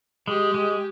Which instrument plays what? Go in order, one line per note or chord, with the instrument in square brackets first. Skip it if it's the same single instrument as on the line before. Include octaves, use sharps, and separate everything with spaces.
[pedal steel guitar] G#3 [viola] G4
[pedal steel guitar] G#3